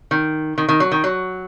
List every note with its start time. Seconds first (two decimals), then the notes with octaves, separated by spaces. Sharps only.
0.11 D#3
0.58 D#3
0.69 D#3
0.80 F#3
0.92 D#3
1.04 F#3